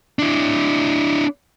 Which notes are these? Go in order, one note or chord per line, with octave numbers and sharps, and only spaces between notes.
D4 E4